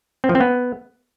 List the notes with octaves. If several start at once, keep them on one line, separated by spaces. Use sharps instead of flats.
C4
F3
C4
B3